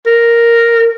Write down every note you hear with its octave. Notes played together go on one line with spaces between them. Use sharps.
A#4